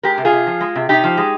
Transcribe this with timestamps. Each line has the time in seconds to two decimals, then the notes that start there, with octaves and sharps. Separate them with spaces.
0.03 G#3 G4 A#4
0.18 C3
0.25 F4 G#4
0.32 C3
0.47 F3
0.61 G#3
0.76 C3
0.89 C3 D#4 G4
1.04 F3
1.17 G#3